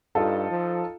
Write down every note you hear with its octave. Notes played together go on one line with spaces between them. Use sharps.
G2 D#4 F4 A4
F3